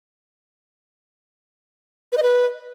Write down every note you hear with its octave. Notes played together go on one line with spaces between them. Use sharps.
B4
D#5
B4